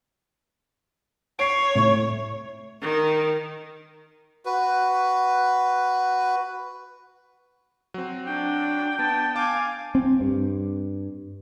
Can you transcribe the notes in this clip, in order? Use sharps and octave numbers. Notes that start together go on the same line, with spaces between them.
C#5 C7 D7
A2
D#3
F#4 B4
F#3 C4
D4 G5
B3 A5
F5 G#5 A5 D6
C4
G2